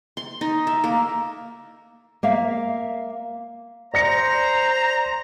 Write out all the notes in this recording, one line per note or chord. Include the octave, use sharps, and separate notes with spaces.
C6
D#4
E5
A#3
A#3 E5 F5
C5 D5 A#5 A#6 C#7